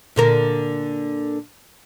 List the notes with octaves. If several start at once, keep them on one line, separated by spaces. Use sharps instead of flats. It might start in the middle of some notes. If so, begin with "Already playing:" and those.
A#2 D3 A#4